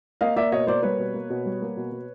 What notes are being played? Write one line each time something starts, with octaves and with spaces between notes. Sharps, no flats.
A#3 D#5 F5
A#3 D5 E5
B2 C#5 D#5
A#3 C5 D5
G3 B4 C#5
B2
A#3
B2
G3
A#3
B2
B2